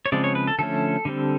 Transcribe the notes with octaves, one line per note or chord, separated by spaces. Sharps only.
C#5
C#3 F3 G#3 C4 D5
C#5
B4
A4
D3 F3 A3 C#4 A4
D3 G3 C4